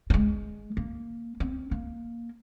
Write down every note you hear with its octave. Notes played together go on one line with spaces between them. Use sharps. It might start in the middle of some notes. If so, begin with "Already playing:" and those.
G3
G#3
A#3
C4
A#3